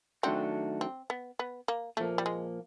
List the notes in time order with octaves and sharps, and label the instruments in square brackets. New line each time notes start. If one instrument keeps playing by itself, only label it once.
[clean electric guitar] D#3 F#3 A3 D4 F#4 [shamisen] C4
[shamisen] C4
B3
B3
A#3
[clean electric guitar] A#2 F3 A#3 [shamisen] A3
[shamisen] G3
G#3